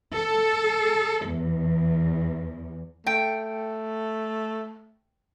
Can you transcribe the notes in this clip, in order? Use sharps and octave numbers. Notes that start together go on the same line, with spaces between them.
A4
E2
A3 G5